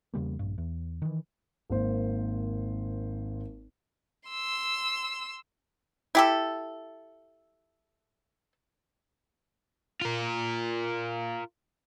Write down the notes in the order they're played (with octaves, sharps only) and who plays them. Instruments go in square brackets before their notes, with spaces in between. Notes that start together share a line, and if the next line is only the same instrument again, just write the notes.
[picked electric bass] E2 C#3 G3 A#3
A#1 G2
E2
D#3 E3
[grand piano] G#1 A#3 C5
[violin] C6 E6
[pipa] E4 G4 A4
[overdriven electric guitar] F4 A#4